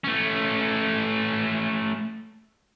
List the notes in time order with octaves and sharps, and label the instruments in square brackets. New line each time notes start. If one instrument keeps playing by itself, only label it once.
[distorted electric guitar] A3 C#4